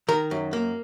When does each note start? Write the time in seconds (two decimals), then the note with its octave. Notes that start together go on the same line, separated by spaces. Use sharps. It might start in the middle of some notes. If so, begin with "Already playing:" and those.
0.08 D#3 A#4
0.31 F#2
0.53 A#3